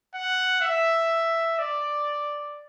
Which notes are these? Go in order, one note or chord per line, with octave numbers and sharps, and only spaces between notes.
F#5
E5
D5